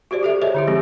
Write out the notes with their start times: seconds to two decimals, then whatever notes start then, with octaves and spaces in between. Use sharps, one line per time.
0.11 F#4 G4 C5 D5
0.23 G4 A4 E5
0.42 G#4 A4 C5 C#5 D#5 E5
0.54 D3 E4 G4
0.67 F3 G#3 C4 G4